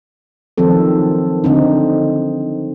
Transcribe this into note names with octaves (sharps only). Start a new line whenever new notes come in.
D#3 F3 F#3 C4 A4
D3 C4 D#4